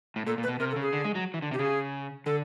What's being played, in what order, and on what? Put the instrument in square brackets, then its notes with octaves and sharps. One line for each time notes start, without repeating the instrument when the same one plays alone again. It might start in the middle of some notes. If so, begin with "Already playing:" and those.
[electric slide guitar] A2
[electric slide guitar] A#2 [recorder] A4
[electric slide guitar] A#2
[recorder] B4
[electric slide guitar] B2
[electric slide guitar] C3 [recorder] A#4
[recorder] A4
[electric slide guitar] C#3
[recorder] G#4
[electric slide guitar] D3
G#3
F#3
E3
D3
[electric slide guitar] C3 [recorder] G4
[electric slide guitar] C#3 [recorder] G#4
[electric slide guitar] D3 [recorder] A4